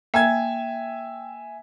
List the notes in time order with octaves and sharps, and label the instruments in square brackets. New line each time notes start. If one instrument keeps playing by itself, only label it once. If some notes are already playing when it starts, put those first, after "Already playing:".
[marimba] A#3 [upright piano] E5 G#5 G#6 [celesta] G5